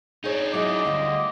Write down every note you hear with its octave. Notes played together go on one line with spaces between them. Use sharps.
D4 D#4 G#4 C#5
F#3 E4 G#4 D#5 D6
D2 G3 F4